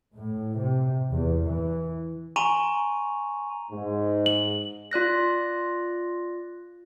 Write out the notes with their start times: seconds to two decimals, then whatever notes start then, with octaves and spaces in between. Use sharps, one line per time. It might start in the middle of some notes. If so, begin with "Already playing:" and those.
0.15 A2
0.56 C3
1.11 E2
1.46 E3
2.36 G#5 A#5 C6 C#6 D#7 F7
3.72 G#2
4.26 F#7
4.91 F4 D5 F#6 A#6